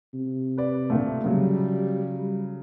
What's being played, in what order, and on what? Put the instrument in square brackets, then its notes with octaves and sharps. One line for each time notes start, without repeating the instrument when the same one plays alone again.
[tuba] C3
[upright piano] B4 D5
D2 A#2 A3
[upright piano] C#3 F#3 [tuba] G3